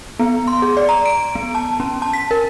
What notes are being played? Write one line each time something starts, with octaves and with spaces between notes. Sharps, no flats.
B3
C6
G#4
D5
A#5
D7
B3
A5
C#4
A5
B6
A#4